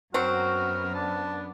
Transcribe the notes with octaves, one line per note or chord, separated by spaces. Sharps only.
F#2 F#3 B3 C4 F#4 A#4
D4 A5